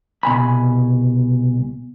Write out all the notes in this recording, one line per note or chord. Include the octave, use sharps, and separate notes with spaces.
C2 B2 G#5 B5